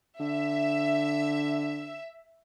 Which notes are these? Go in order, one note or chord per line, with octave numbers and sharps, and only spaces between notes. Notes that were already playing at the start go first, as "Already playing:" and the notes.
D3 E5